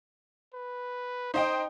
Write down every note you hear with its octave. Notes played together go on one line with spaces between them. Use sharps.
B4
D#4 C5 D#5 G5